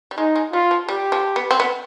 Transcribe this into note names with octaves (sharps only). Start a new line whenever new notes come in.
G3
G#3 D#4
G#3
G3 F4
F3
G3 G4
F3
B3
C4
B3